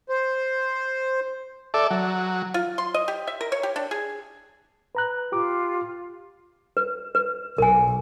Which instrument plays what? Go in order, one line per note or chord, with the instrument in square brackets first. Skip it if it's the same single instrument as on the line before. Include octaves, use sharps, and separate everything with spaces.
[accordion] C5
[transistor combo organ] A4 D5 E5
F#3
[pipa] F4
C6
D#5
G4
E5
A#4
C#5
G4
D4
G#4
[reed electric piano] B4 A#5 F#6
[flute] F4 [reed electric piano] G4 D6
[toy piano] B4
B4
[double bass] B1 [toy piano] A#4 G#5